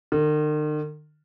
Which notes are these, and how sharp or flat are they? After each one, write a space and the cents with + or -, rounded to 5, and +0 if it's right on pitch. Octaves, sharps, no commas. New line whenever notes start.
D#3 -45